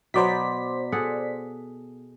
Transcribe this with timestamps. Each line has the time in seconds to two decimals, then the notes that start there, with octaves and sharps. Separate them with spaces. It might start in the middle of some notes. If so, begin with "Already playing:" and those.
0.14 B2 F#3 B3 C5 D5 B6
0.92 G#4 A4 F#5